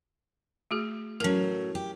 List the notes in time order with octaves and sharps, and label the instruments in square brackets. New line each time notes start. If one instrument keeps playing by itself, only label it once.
[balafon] A3 F#4 G#4
[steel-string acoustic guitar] A2 F#3 [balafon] C#4 A#4
[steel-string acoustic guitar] G4